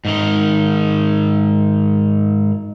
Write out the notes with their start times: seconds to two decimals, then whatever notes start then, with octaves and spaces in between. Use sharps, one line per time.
0.05 G#2 D#3